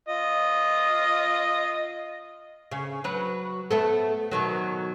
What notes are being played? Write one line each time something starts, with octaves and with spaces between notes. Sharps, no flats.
F4 D#5
C#3
F#3 B4
A3 B3 A4
B2 D#3 F#3